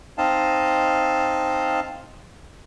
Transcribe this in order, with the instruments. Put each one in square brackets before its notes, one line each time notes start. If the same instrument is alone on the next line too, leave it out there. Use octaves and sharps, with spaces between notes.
[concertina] C4 D#4 D#5 F5 A5